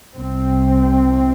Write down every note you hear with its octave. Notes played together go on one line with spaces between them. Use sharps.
C2 C3 C4